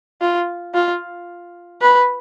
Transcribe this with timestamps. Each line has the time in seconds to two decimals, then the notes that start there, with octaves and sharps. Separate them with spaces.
0.21 F4
0.74 F4
1.81 B4